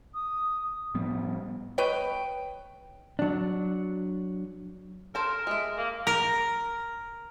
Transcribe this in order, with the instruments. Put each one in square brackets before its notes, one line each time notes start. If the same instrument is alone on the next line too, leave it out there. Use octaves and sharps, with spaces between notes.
[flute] D#6
[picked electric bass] A2 F3 G3 B3
[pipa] B4 C#5 D#5 G5
[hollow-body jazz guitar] F#3 D4
[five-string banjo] A4 C5 A#5 [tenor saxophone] A#4
[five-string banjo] G#3 E5
[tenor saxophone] A#3
[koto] A#4